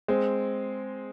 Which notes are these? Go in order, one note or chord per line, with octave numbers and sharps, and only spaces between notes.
G#3 C4